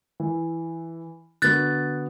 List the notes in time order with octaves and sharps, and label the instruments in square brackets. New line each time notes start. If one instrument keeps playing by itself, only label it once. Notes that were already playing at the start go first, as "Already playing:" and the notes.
[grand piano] E3
[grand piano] D3 B3 F#4 [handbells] F#6 A6